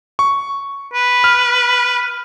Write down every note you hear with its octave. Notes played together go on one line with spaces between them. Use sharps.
C#6
B4
F6